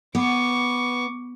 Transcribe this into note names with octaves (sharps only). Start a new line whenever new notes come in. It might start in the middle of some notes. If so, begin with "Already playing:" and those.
B3 C#6 D6